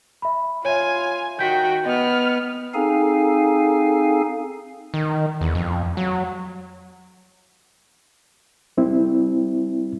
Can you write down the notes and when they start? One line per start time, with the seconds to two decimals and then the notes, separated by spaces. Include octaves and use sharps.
0.22 E5 B5
0.65 F4 C#5 E5 G#5
1.39 D#3 F#4 G5 G6 B6
1.86 B3 B4 D#5 F6
2.74 C4 D#4 G#4 A4 F5 G#5
4.94 D#3
5.41 E2
5.55 F2
5.97 F#3
8.77 G3 C4 E4